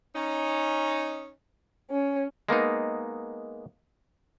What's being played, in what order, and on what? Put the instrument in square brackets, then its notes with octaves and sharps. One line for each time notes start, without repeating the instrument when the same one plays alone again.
[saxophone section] C#4 D#4
[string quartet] C#4
[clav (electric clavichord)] G#3 A#3 B3 D#4